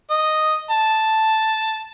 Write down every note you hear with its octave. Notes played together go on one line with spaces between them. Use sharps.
D#5
A5